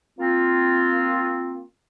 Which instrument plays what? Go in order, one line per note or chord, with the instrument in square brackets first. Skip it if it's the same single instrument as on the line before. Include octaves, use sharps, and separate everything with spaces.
[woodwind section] A#3 C4 F4